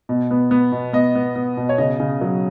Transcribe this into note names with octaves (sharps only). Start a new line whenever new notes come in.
B2
B3
B3
B2
B3 D#5
B3
B3
B2
C#5
C#3 D#5
C#3
F#3